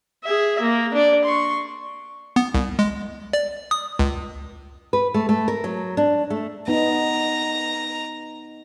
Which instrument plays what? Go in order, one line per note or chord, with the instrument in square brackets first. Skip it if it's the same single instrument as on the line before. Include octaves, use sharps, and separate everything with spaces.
[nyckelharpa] G#4 E5
A#3
D4 D5
C6 C#6
[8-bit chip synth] B3
C2
G#3
D5
D#6
C#2
[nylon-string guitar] B4
A3
A3
A#4
F#3
D4
A3
[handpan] B3 D#4 [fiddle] A#5